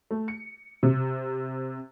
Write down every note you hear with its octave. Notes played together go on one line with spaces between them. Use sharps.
A3
C#7
C3